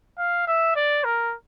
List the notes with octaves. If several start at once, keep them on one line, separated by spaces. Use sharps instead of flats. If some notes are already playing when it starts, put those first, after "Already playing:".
F5
E5
D5
A#4